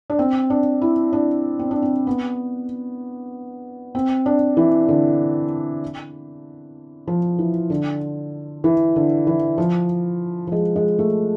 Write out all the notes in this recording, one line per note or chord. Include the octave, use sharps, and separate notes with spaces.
D4
C4
D4
E4
D4
C4
D4
C4
B3
C4
D4
E3
D3
F3
E3
D3
E3
D3
E3
F3
F3
G#3
G#3
A3